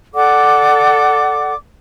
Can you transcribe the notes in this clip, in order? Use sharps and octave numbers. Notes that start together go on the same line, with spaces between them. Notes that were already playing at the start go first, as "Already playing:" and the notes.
A4 D5 F#5 D6